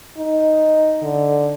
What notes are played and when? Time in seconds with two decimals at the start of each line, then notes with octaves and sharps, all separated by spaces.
0.18 D#4
1.02 D3